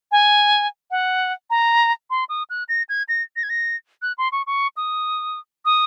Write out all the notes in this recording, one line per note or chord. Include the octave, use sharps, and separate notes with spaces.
G#5
F#5
A#5
C6
D#6
F#6
A#6
G#6
A#6
A#6
G#6
A#6
F#6
C6
C#6
C#6
D#6
D#6